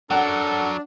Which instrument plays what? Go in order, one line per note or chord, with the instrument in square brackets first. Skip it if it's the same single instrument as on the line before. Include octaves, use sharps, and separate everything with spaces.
[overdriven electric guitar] F#3 A#4 [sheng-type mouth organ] D4 [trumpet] A4 [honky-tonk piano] F#5